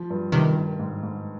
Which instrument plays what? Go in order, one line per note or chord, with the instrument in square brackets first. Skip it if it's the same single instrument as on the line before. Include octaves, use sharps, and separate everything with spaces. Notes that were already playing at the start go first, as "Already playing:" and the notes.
Already playing: [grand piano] F3
G2
[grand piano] G2 [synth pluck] C3 D#3
[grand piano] D#3
G#2
G#2